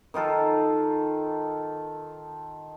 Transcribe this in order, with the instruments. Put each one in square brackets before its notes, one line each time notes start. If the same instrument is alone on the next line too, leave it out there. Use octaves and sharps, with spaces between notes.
[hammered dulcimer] D#3 D#4 F4 A4